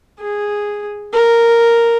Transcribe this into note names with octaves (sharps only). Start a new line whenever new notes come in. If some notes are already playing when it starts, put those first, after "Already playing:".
G#4
A#4